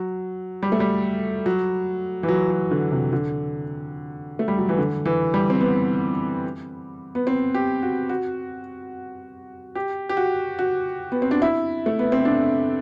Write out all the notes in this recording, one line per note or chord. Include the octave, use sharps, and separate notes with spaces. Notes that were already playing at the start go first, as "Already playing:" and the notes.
Already playing: F#3
G3
A3
G3
F#3
E3
F#3
F#3
D3
C3
D3
A3
G3
F#3
E3
D3
E3
G3
C4
B3
B3
C4
G4
F#4
F#4
G4
G4
F#4
F#4
B3
C4
D4
E4
A3
B3
C4
D4